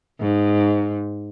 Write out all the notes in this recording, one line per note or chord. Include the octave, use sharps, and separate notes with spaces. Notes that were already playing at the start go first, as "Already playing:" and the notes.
G#2